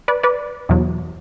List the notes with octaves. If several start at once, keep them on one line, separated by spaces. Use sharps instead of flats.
B4 D5
B4 D5
E2 B2 F#3